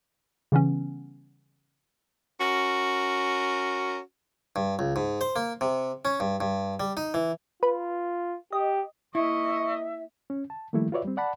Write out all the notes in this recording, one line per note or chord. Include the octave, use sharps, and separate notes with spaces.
C#3 E3 G3 B3 C#4
C#4 F#4 A#4
G2
C#2
G#2
C5
A#3
C3
C#4
G2
G2
G3
D#4
E3
F4 B4
G4 D#5
A#3 E4 D#5 E5 C#6
C#4
A5
D#3 F3 G3 A3 A#3 E4
F4 F#4 B4 C#5 D5 E5
G3 C4
D5 F#5 A5 B5